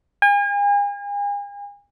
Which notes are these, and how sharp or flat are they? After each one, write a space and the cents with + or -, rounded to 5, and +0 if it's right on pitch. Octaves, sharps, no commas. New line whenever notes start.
G#5 -40